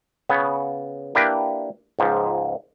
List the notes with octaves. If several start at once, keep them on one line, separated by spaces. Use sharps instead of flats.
C#3 B3 C#5
A#3 D4 E4 G4 A#4 B4
C#2 G#2 F3